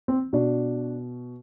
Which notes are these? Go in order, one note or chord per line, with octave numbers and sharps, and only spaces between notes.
C4
B2 D4